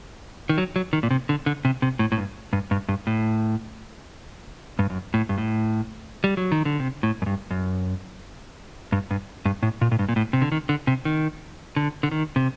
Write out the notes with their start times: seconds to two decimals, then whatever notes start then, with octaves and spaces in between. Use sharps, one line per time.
0.49 D#3
0.58 F#3
0.76 F#3
0.93 D#3
1.03 A#2
1.11 C3
1.29 D3
1.46 D3
1.65 C3
1.82 C3
1.99 A2
2.12 A2
2.17 G2
2.53 G2
2.71 G2
2.88 G2
3.07 A2
4.79 G2
4.90 F#2
5.14 A2
5.29 G2
5.38 A2
6.24 G3
6.37 F#3
6.52 D#3
6.65 D3
6.80 C3
7.03 A2
7.22 F#2
7.26 G2
7.51 F#2
8.92 G2
9.10 G2
9.45 G2
9.63 A2
9.81 A#2
9.91 A2
9.99 G2
10.09 A#2
10.16 A2
10.33 C3
10.42 D3
10.52 D#3
10.69 D3
10.87 C3
11.05 D#3
11.76 D3
12.03 D3
12.11 D#3
12.36 C3